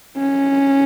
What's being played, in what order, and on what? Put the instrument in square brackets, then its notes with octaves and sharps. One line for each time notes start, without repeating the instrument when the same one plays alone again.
[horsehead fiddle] C#4